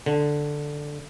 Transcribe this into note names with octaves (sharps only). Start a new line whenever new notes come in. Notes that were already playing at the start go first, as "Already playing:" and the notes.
D3